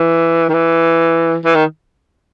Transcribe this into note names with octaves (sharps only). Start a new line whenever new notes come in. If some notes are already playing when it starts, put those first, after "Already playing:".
Already playing: E3
D#3
E3
E3
D#3